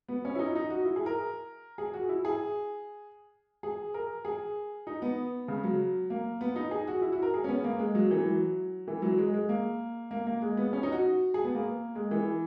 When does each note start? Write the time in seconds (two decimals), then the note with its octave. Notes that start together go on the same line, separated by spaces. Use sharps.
0.08 B3
0.25 C#4
0.35 E4
0.39 D#4
0.55 D#4
0.70 F#4
0.85 E4
0.96 G#4
1.06 A#4
1.78 G#4
1.94 F#4
2.09 E4
2.25 G#4
3.63 G#4
3.94 A#4
4.25 G#4
4.87 D#4
5.02 B3
5.48 C#3
5.64 F#3
6.10 A#3
6.41 B3
6.56 D#4
6.71 G#4
6.87 F#4
7.02 E4
7.12 F#4
7.22 A#4
7.34 G#4
7.44 C#4
7.48 B3
7.64 A#3
7.79 G#3
7.95 F#3
8.11 E3
8.26 F#3
8.88 E3
9.02 F#3
9.18 G#3
9.33 G#3
9.49 A#3
10.11 A#3
10.27 A#3
10.42 G#3
10.57 B3
10.73 C#4
10.83 D#4
10.92 F#4
11.34 G#4
11.44 B3
11.55 A#3
11.95 G#3
12.11 E3